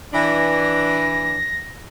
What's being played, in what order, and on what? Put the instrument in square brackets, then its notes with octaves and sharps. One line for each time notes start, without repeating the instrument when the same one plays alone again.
[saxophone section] E3 D4 [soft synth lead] A#6